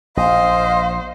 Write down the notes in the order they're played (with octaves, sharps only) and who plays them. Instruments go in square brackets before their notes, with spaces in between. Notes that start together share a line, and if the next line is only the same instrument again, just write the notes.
[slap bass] A#1 [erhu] C5 [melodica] D#5 [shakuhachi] F5